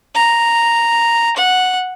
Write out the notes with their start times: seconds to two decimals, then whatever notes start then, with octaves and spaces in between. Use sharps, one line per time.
0.15 A#5
1.37 F#5